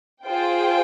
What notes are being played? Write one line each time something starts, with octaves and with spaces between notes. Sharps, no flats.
F4 G#4 C5 G5